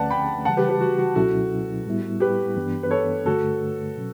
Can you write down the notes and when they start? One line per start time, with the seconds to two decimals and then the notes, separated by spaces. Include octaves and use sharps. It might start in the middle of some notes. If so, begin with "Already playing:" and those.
Already playing: D2 D3 A3 C#4 B4 D5 F#5 A5
0.10 G5 B5
0.45 C#3 E3 G3 F#5 A5
0.57 G4 B4
0.69 G4 B4
0.81 F#4
0.98 F#4
1.15 C#2 B2 F#3 C#4 E4 F#4 A4
1.86 A2 G3 B3 E4
2.20 G4 B4
2.57 G2 E3 B3 D4
2.83 B4
2.91 A4 C#5
3.26 G2 D3 A3 F#4 A4
3.96 B2 F#3 C#4